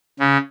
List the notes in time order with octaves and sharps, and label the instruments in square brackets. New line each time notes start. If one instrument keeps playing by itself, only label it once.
[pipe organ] C#3